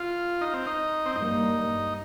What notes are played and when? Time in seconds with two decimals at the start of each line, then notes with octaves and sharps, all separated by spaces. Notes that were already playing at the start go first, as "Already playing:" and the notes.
Already playing: F4
0.41 D#4
0.54 C4
0.66 D#4
1.06 C4
1.15 G2 G3 A#3 D#4